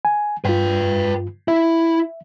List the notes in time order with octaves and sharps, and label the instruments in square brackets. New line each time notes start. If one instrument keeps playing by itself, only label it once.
[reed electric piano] G#5
[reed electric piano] G2 F4 [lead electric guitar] B4 G5
[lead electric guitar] E4 [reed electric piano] E5